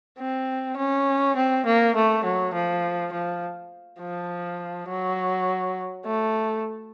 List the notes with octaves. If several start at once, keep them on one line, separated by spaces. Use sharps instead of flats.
C4
C#4
C4
A#3
A3
F#3
F3
F3
F3
F#3
A3